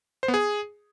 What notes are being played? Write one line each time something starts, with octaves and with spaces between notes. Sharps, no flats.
C5
B3
G#4